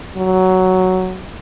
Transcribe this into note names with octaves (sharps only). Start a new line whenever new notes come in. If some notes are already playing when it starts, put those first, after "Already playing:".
F#3